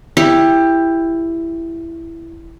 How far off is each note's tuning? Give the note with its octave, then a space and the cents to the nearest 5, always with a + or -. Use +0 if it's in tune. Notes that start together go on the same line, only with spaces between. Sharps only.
E4 +10 G4 +15